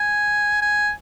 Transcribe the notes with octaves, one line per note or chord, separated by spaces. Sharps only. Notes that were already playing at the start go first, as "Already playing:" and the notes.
Already playing: G#5
G#5